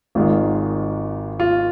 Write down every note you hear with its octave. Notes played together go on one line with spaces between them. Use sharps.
G#1 G#2 D#3 G#3 F4
F4